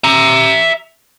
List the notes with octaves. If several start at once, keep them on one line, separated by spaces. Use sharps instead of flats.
E5 A#5